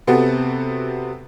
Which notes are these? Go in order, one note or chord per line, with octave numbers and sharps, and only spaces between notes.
C3 B3 C4 F#4 A4